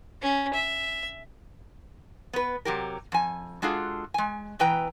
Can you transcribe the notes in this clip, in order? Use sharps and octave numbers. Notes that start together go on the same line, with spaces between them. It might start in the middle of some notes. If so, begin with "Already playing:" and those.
C#4
E5
B3 B4
C3 F#3 G4 A#4
F2 G#5
G#3 D4 F4 F#4 G#4 A4
G#3 G#5
B2 E3 B4 G5 A#5